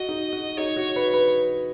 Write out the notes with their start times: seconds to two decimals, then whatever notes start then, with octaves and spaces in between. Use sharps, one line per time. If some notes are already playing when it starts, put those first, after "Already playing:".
Already playing: F#4 D#5
0.09 D#4
0.33 F#4
0.58 D#4 C#5
0.77 F#4
0.96 B4
1.14 B4